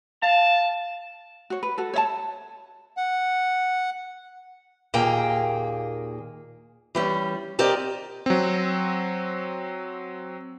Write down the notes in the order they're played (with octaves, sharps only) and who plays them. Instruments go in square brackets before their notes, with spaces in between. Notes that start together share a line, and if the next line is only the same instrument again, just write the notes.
[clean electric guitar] F5 [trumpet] A5
[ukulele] F#4 C#5
B4
F#4 A4
C#5 E5 A5
[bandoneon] F#5
[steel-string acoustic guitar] D#2 A#2 A#3 G#4 G5
E3 G3 C#4
C4 G4 A#4 D5 D#5
[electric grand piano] F#3 C4